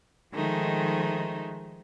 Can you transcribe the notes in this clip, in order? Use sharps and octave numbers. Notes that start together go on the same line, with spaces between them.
D#3 F3 G#3 A3 D#4